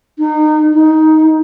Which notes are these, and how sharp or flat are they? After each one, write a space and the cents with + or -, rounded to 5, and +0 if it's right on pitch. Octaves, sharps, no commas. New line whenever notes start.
D#4 -25
D#4 +10